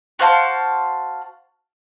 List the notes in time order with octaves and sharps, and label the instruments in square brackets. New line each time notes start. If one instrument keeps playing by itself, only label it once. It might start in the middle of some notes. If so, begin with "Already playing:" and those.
[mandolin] F#4 C5 F5 A5